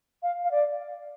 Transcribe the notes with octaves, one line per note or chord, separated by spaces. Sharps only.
F5
F5
D5